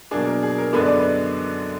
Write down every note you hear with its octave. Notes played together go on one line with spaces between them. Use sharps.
B2 F#3 A#3 D4 G#4
A#4
G#4
A#4
F#2 D3 G#3 B3 D4 B4
D5
B4